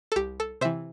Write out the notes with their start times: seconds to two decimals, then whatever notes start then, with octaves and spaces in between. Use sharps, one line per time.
0.12 A4
0.16 C2 G4
0.40 A4
0.61 C3 E3 C5 E5